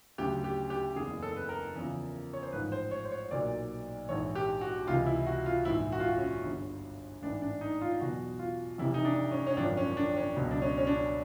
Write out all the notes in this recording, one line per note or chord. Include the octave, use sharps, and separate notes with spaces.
D2 C#3 F#3 G4
G4
G4
F#1 E2 C#3 G#4
A4
B4
A#4
E2 C#3 F3
C#5
C5
A1 G#2 F3 B4
C5
C#5
C5
C#5
B1 A#2 F#3 D5
A#1 G#2 E3 C#5
G4
F#4
C#2 C3 E3 F4
E4
F#4
F4
A#1 G#2 E3 E4
F#4
F4
F#4
C#4
G1 G2 D3
A1 G#2 E3 D4
D4
D#4
F4
E2 B2 F#3 F#4
F4
F1 F2 C3 E3 E4
D#4
D4
C#4
C#4
G#1 F#2 D3 F3 D4
C#4
D4
C#4
C#2 B2 F#3
D4
C#4
C#4
D4